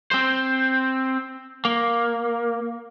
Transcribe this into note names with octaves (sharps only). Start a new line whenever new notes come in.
C4 C5
A#3